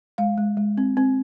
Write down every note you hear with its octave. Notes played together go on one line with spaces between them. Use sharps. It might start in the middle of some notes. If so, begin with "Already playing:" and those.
G#3 F5
G#3
G#3
C4
C4